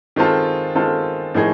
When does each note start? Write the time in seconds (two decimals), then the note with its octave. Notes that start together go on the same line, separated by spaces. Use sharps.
0.16 D#3 G#3 C4 F4 A4
0.75 D#3 G#3 C4 F4 A4
1.35 A2 F3 A#3 D#4 G#4